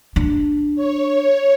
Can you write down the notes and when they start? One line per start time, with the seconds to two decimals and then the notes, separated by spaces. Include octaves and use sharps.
0.16 D4
0.75 C#5